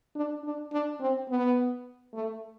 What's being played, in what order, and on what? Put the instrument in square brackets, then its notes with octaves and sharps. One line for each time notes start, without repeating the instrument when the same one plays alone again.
[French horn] D4
D4
D4
C4
B3
A3